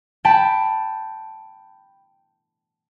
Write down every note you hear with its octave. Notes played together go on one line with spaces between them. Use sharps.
G5 A5 B5